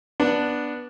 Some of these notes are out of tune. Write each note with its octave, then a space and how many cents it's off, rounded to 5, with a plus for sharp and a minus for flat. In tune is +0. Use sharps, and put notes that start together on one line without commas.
B3 -10 D4 +0